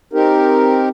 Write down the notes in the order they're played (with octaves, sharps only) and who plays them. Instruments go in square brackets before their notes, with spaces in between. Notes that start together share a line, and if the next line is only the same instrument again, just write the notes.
[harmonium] C4 D#4 G4 A#4